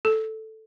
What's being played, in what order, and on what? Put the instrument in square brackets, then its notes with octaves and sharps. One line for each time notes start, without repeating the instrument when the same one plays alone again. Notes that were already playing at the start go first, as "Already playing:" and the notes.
[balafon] A4